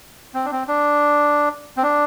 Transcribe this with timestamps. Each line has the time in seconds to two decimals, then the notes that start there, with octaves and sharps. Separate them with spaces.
0.34 C4
0.45 D4
0.52 C4
0.68 D4
1.77 C4
1.83 D4